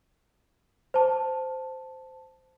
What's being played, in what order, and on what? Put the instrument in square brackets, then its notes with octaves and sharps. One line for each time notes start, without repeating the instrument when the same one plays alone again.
[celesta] C5 A5